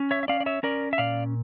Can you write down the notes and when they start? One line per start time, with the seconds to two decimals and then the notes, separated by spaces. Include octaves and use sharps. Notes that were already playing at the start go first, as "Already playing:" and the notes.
Already playing: C#4
0.11 C#5 E5
0.23 E5
0.28 C#4 D5 F5
0.40 D5
0.46 C#5 E5
0.63 C#4 A#4 D5
0.93 E5
0.98 A#2 D5 F5